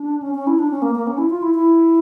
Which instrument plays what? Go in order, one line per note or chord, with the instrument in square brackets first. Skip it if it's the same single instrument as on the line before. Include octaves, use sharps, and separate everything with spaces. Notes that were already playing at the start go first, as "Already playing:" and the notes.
Already playing: [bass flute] D4
C#4
C#4
E4
D4
C#4
A#3
A#3
C#4
E4
F4
E4
E4